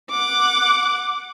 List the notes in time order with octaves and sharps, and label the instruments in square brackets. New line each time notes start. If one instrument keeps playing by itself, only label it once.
[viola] F#5 D6